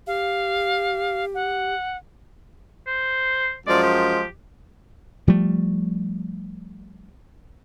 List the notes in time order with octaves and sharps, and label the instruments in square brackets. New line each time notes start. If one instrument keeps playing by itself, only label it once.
[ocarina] G4 [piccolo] F5
[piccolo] F#5
[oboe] C5
[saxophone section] F#2 F3 G#3 [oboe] D5
[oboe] G4
[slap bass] F3 G3 A3